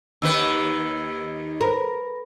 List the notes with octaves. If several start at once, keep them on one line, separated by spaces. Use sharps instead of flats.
D#2 D#3 B4 E6
A#4 B4 B5 A#6